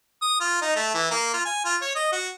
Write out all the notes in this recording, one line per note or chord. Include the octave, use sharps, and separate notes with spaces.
D#6
F4
D#4
A3
E3
A#3
F4
G#5
F4
C#5
D#5
F#4